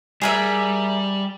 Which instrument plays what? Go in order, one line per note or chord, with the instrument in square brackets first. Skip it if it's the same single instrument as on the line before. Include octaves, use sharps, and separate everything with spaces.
[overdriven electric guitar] G3 [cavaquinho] G#4 A#4 E5